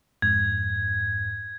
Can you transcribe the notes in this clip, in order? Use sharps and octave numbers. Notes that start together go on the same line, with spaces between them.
F2 G#2 G#6